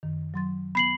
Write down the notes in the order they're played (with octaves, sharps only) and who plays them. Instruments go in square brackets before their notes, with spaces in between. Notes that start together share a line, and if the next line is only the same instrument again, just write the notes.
[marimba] F#2 D#3
F#3 C6 A6
[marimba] B3 [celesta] B5 C7 F#7